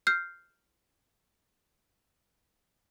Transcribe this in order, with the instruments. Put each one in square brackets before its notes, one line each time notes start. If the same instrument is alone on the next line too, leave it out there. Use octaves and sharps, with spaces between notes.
[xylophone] F6 G6 C7